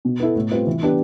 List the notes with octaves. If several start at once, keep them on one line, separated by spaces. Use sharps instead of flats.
B2
B3 E4 A4
A2
G3 C4 F4 B4
E3
B3 D4 G4 B4